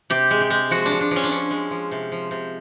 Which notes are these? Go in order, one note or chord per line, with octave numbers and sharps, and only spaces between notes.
C3 G4
G#3
G4
G#3
F3 F#4
D4
F3
D4
F3
C#4
D4
F3 C#4
G#3
F3
C3
F3
C3